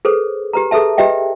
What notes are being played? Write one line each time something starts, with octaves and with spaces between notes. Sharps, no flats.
G#4 A4 B4 C5
G4 B4 A#5
G#4 A4 B4 E5 A5
G4 B4 D#5 E5 G5